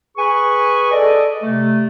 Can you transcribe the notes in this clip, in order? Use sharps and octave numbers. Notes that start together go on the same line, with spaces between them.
G#4 B4 G#5 B5 C#6
A4 D5 D#5
C3 A3